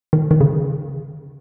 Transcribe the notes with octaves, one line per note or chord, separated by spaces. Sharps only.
D#3
D#3
C#3